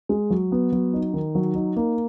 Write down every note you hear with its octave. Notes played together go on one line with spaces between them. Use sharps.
G#3
F#3
B3
F#3
D#4
D#3
F#3
D#4
A#3